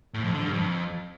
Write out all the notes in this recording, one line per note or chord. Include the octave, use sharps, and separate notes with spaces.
A2
F2
D3
G2
F2